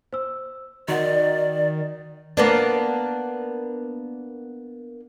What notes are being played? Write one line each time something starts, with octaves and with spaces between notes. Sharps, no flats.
C5 E6
D#3 F#4 D5 D#5 F#5
A#3 B3 D4